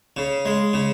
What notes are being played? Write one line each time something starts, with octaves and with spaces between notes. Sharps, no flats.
C#3
G#3
C#3